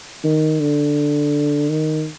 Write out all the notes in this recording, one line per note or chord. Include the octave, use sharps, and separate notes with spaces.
D#3
D3
D#3